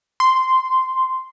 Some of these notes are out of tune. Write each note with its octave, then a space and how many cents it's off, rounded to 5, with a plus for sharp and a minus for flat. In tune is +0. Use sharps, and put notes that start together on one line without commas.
C6 -10